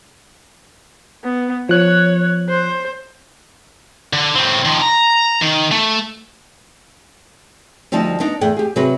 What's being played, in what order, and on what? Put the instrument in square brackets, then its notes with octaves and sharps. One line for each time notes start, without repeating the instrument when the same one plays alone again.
[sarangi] B3
[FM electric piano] F3 F#6 [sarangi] C#5
[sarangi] C5
[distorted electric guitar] D3
A2 C4
D#3 F3
A#5
D#3
A3
[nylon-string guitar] D2 F3 G3 D#4 A5
B3 D4 D#4
E2 A3 G#4 F#5 G5
G4 G#4
C3 F#3 F#4 G#4 B4